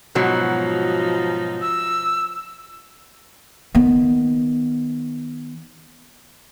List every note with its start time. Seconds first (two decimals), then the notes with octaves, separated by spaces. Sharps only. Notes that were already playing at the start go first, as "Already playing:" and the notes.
0.15 G#2 B2 F3 F#3 D#4
1.62 E6
3.75 D#3 B3